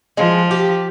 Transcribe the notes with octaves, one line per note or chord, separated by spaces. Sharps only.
F3 G#3
G4